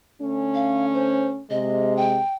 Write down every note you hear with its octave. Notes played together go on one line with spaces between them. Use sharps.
D3 A3 C#4
F5
C5
C3 G#3 D#5
G5